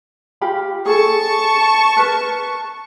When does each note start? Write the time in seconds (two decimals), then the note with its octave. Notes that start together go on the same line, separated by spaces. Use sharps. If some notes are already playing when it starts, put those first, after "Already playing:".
0.41 F4 G4 B5
0.86 G#4 A4 A5 C#6
1.97 A#4 B4